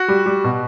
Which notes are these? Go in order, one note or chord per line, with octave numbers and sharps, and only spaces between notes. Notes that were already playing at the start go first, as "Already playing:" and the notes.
Already playing: F#4
G3
G3
B2